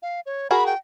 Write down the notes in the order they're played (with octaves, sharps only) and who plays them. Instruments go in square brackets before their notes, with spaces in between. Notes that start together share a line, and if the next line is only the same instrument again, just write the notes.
[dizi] F5
C#5
[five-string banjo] F#4 G#4 A#4 [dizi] B5
[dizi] G5